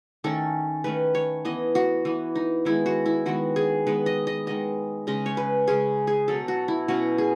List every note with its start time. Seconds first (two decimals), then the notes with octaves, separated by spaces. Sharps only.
0.24 D#3 A3 C#4 A4
0.84 D#3 A3 C#4 B4
1.15 C#5
1.45 E3 B3 D#5
1.75 F#4
2.05 E3 B3
2.35 D#4
2.65 D#3 G#3 B3 E4
2.86 F#4
3.06 E4
3.26 D#3 G#3 B3 F#4
3.56 G#4
3.87 D#3 G#3 B3 B4
4.06 D#5
4.27 D#5
4.47 D#3 G#3 B3 D#5
5.07 C#3 G#3 C#4 D#5
5.26 C#5
5.37 B4
5.67 C#3 G#3 C#4 G#4
6.07 G#4
6.28 B2 F#3 C#4 A4
6.48 F#4
6.68 E4
6.88 B2 F#3 C#4 F#4
7.18 G#4